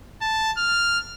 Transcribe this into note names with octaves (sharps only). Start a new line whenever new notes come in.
A5
F6